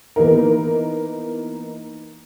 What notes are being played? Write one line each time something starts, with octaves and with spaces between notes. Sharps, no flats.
E3 A#3 B3 D#4 A#4